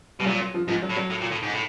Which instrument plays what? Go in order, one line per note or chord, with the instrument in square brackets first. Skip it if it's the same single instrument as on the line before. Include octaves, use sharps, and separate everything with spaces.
[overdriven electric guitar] B2 [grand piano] G3
[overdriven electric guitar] A#2 [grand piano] F#3
[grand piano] F#3
F3
[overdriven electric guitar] G#2 [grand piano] F3
[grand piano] F#3
[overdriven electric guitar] A2
[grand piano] F#3
[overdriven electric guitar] A2
A#2
A2
G#2
A2